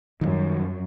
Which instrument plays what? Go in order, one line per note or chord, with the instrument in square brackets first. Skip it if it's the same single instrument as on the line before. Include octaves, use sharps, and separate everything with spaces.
[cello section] F#2 [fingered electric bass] D#3 F3 G3